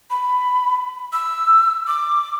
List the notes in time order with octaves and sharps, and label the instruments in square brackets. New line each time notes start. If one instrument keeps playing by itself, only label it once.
[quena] B5
E6
D6